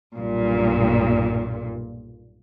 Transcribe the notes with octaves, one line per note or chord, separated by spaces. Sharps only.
B1 G2 A#2